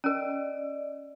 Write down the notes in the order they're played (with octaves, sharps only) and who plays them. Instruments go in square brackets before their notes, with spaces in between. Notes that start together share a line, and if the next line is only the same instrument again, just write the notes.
[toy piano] C#4 A#4 [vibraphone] D5 D#5